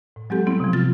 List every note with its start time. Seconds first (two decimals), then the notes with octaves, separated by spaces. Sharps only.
0.16 A2
0.30 F#3 G#3 C4 G4 A4
0.46 F#3 G3 B3 C4 E4
0.60 C3 F3
0.73 F4 A6